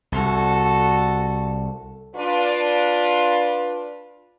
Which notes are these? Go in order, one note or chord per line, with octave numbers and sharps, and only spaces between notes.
C2 F#4 A4
D4 F4 B4